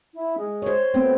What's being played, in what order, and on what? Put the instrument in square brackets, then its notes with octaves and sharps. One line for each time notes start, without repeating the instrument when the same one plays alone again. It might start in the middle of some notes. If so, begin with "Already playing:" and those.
[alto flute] E4
G#3
[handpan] C5 C#5
[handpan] A3 B3 C4 [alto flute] G5